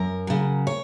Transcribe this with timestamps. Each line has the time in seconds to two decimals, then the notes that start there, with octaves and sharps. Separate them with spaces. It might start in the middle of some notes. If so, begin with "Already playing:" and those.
Already playing: F#2 A#4
0.27 C#3 F#3
0.67 C#5